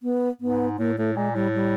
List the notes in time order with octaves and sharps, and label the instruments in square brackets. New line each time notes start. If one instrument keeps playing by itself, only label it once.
[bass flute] B3
[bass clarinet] G#2 [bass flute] B3
[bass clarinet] A2 [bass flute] A#3
[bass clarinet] A2 [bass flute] A3
[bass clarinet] A#2 [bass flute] G#3
[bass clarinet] A2 [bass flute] G3
[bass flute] G3